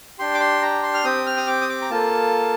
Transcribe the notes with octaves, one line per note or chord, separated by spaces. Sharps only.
D4 G4 C6
D6
C6
A#5
C6
F6
C4 G4 D#6
F6
D#6
D6
D#6
D6
A#5
A#3 F4 A4 A5